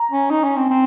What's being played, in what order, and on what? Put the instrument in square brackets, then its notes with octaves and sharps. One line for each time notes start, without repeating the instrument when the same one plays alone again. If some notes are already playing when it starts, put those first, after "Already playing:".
Already playing: [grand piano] A#5
[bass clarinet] C#4
D#4
C#4
C4
C4